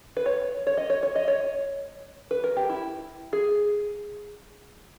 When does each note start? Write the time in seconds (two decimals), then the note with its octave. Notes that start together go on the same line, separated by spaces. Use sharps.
0.17 B4
0.26 C#5
0.67 C#5
0.77 D#5
0.90 C#5
1.03 C#5
1.16 D#5
1.28 C#5
2.31 B4
2.44 A#4
2.56 G4
2.69 E4
3.33 G#4